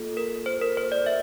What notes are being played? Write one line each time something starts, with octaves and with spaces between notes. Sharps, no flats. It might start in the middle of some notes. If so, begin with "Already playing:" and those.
Already playing: A#3 F4 A4
A#4
C5
A#4
C5
D5
E5